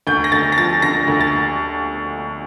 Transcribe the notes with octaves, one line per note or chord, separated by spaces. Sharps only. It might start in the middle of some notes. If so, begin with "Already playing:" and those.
D2 G6
A#6
D2 A6
A#6
F3 A6
D3 A#6
D2
A6